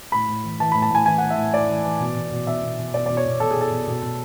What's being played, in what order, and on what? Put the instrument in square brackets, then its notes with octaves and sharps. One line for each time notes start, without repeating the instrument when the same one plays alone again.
[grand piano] A2 B5
A2
E3
E3 A5
A2 B5
A5
A2 G#5
E3 G#5
E3 F#5
E5
A2
A2 D5
E3
E3
B2
B2
B2
B2 E5
B2
B2
B2 D5
B2 D5
C#5
B2
B2 A4
G#4
B2 A4
B2
B2
B2